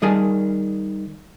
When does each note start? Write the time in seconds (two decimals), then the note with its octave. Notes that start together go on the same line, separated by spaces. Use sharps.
0.02 D#3 G3 G#4 A#4 G#5 A5